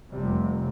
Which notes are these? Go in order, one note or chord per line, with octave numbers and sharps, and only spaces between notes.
F1 F2 C3 G3